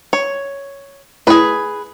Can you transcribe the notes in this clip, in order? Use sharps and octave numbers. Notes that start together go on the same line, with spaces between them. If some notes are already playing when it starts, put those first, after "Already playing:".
C#5
A2 G#4 B4